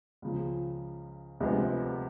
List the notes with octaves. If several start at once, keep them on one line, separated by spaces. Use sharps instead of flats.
C#2 C#3 F3
D2 C3 F3 G#3 B3